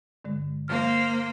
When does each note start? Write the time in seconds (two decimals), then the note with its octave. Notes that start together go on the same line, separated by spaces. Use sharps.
0.25 G2 D3 G#3
0.68 A#3 C5 F6